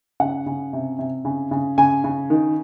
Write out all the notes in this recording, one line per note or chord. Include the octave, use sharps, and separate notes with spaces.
C#3 F#5
C#3
C3
C3
C#3
C#3
C#3 G#5
C#3
D#3